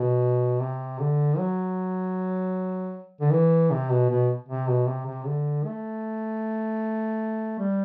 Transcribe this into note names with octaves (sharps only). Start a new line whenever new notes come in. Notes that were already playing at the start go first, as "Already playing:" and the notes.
Already playing: B2
C3
D3
F#3
D3
E3
C3
B2
B2
C3
B2
C3
C3
D3
A3
G3